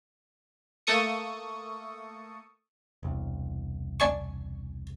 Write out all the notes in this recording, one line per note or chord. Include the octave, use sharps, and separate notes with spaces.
A3 A#3 A4 C#6 D#6 C#7
E1 C2
D4 G#5 C#6